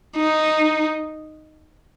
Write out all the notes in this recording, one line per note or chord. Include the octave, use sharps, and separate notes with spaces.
D#4